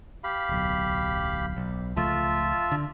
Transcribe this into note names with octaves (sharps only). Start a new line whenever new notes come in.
G4 F5 B5
D1 B1
B1
C#2 F3 A3 F4 E5 A5
D3